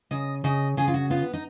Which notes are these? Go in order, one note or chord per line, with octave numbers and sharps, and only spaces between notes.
C#3 D#5
C#3 D#5
C#3 G#4
F4
F#4
B3 F4
D#4